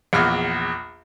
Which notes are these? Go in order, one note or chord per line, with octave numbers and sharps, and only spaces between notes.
A#1 E2 F6